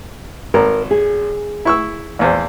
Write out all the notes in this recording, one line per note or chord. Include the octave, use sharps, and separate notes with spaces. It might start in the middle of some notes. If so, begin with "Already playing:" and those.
G#1 A#4
G#4
E4 C#6 E6
A#1 E2 C5